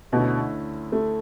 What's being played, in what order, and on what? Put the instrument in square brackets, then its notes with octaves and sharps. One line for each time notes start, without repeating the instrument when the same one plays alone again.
[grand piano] D2 D3 A3 C#4 E4 [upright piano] B2
[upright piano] A3